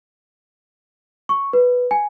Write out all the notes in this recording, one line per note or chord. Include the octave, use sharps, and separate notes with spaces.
C#6
B4
G#5